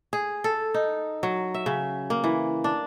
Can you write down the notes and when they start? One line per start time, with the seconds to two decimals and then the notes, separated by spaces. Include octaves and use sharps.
0.13 G#4
0.44 A4
0.74 D#4
1.23 F#3
1.54 E5
1.66 C#3
2.10 A#3
2.24 E3
2.64 D4